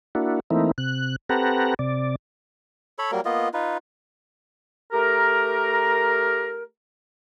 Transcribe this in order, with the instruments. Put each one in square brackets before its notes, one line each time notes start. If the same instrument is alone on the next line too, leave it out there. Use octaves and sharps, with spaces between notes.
[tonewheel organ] A#3 D4 E4 F#4
E3 A3 A#3 C4 D#4 E4
C3 F#6
C4 G4 A4 B4 F#5 A#5
C3 D5
[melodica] A4 C#5 B5
F#3 G3 A#3 A#4
A#3 B3 F4 D#5
D#4 F4 B4
[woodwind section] A3 G4 A#4